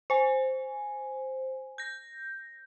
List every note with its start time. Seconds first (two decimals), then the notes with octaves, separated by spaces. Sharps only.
0.10 C5 G#5
1.78 G6 A#6